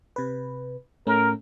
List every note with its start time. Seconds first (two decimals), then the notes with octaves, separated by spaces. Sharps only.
0.16 C3 B4
1.07 A2 A3 C#4 A#4